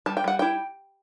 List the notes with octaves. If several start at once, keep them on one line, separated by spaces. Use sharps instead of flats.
G3 A5
G5
G3 F#5
E4 G5